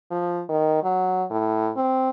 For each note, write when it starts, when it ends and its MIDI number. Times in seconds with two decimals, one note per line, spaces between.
0.11 0.42 53
0.49 0.83 51
0.83 1.25 54
1.30 1.70 45
1.76 2.10 60